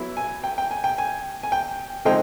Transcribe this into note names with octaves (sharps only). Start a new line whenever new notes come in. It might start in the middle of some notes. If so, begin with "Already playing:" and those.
Already playing: F#3 B3 E4
G#5
G5
G5
G#5
G5
G#5
G#5
G5
D3 F3 G#3 C4 D#4 G5